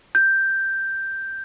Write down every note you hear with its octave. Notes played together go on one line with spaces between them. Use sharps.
G6